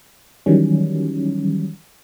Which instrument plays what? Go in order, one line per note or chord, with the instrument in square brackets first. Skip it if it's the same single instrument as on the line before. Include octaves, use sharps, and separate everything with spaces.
[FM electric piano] D#3 E3 F#3 G3 C#4